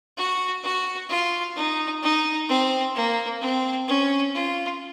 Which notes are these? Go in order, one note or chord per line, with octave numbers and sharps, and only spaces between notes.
F#4
F#4
F4
D#4
D#4
C4
A#3
C4
C#4
F4